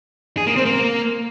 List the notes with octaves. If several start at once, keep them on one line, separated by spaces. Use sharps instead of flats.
G#4
A#3
C4
A#3